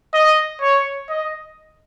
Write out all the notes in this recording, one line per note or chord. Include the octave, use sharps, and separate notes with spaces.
D#5
C#5
D#5